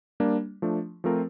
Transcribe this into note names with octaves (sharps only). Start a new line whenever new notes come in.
G3 A#3 D4
F3 A3 D4
F3 A3 C4 F4 A#4